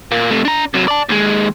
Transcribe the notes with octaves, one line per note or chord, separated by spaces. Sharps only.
A#2 A#3
C3 A3
D4 A#5
C3 F#3
D5 A5
D#2 G#3